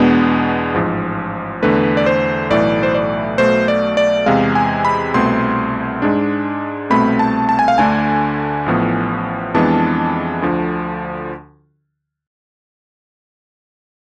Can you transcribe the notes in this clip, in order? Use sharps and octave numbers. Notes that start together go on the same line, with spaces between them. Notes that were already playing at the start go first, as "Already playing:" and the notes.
Already playing: E2 B2 G#3 B3 D4
A1 G#2 F3
E2 D3 A3 B4
D5
C5
B1 A2 E3 A3 D5
C5
D5
B1 B2 A3 C5
D5
D5
E2 C3 G#3 F5
G#5
B5
C2 B2 A3 C4 C6
G#2 G#3 D4
C2 B2 A3 C4 B5
A5
A5
G#5
F5
D2 D3 A3 D4 G#5
A1 A2 F3 B3
F2 E3 G#3 B3 D4 A5
D2 D3 F3